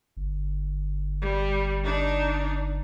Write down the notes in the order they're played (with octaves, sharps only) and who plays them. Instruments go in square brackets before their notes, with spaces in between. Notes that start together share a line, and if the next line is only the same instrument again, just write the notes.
[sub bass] G1
[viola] G3
D4 D#4